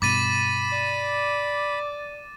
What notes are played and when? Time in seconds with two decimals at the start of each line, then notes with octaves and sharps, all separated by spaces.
0.02 G2 B2 B5 D6 A6 D#7
0.72 D5